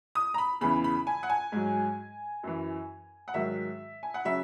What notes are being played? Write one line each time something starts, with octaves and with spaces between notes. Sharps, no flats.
D#6
A#5
B5
E2 C#3 E3 B5
B5
G#5
F#5
G#5
G#2 F#3
F#2 E3
F#5
G#2 D#3 F#3 E5
G#5
F#5
C#3 F#3 E5